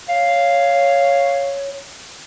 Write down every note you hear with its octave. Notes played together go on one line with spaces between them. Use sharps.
C#5 F5